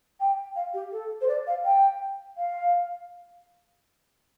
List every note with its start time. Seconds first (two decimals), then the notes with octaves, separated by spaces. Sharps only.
0.20 G5
0.55 F5
0.73 G4
0.92 A4
1.21 C5
1.28 D5
1.47 F5
1.64 G5
2.37 F5